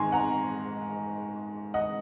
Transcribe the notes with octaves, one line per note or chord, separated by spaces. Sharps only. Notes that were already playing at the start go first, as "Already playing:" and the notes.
Already playing: G#2 D#3 G#3 G#5 A#5 C6 C#6
F#5 A#5
D#5 F#5